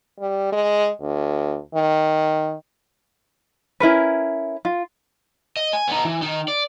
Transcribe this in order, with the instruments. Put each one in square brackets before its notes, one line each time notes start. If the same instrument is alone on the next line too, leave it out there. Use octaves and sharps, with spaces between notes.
[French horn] G3
G#3
D2
D#3
[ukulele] C#4 E4 A#4 B4
F4
[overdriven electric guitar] D#5
G#5
B3 D#4
E3
D#3 D#4
D5